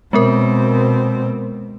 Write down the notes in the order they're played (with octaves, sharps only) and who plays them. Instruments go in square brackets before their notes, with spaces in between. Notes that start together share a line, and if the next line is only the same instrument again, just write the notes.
[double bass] B2 C4 [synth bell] G#3 B3 A#4